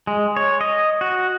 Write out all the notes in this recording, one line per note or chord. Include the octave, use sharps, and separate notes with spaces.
G#3
C#5
D#5
F#4